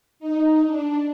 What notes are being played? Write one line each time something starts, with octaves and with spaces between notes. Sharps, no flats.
D#4
D4